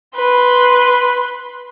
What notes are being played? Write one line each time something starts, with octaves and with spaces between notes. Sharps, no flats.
B4 C6